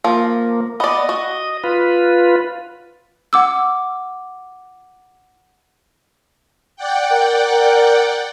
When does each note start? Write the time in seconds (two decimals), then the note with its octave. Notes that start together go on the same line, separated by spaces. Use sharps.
0.04 F3 A#3
0.80 B3 D5 D#5
1.09 F#4
1.64 F4 B4
3.33 F#5 D6 E6
6.76 D5 F#5 G5
7.11 A#4
7.51 A#4